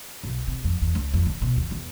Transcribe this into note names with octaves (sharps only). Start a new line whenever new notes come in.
B1
C3
F2
E2
C#2
F2
D3
B2
D#2
E2